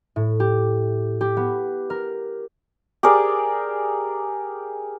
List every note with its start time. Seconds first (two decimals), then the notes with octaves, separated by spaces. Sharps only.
0.16 A2
0.40 G4
1.21 G4
1.37 B3
1.90 A#4
3.03 G4 G#4 A#4 D5